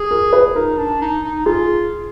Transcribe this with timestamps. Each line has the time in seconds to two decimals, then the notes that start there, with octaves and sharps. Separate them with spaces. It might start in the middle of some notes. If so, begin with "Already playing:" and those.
Already playing: G#4
0.11 A#4
0.33 B4
0.55 D#4 A#4
0.77 D4
1.01 D#4
1.23 D#4
1.45 F4 G#4